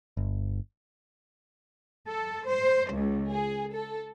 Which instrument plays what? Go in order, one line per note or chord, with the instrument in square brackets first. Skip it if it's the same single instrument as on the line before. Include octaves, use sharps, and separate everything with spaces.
[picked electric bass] G1
[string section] A4
C5
C#2
G#4
A4